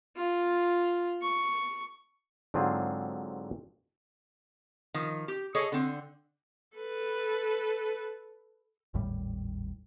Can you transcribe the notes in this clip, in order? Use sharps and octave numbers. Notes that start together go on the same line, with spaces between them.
F4
C#6
G#2 D3 F#3 C4 F4 G#4
D#3 F3
G4
G#4 A4 C#5 D#5
D3 C4
A4 B4
G#1 D#2 A2 G3